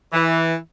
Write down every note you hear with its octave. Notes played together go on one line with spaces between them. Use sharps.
E3